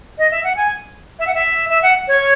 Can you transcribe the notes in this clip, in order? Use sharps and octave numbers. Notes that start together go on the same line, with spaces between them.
D#5
E5
F#5
G#5
E5
F#5
E5
E5
F#5
C#5